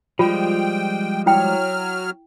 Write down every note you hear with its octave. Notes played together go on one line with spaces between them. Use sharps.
F3 G3 G#3 F4 G5
F#3 E4 G5 F6